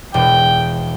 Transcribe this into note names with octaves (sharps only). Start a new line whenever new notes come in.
E1 G5